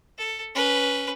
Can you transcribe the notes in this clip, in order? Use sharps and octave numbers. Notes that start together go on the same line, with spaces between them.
A4
C#4 B4